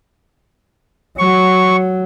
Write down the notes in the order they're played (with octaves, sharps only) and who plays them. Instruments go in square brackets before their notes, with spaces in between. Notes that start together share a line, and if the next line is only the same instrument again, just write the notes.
[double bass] F#3 [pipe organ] C#6